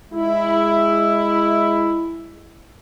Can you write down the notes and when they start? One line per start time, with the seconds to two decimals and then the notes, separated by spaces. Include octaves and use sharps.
0.12 G#3 E4